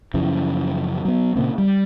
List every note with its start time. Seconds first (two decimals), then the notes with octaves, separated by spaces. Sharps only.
0.14 F#2 C#3 E3 F3
1.05 F#3 B3
1.35 A#2 C#3 A#3 C4
1.58 G3